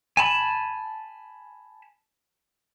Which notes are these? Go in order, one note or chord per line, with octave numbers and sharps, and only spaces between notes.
G#5 A5 B5